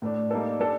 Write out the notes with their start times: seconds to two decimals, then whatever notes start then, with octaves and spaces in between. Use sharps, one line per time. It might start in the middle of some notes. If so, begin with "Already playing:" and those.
0.02 A2 A3 D4
0.31 G3 A#3 D#4 A4
0.59 G3 D4 A4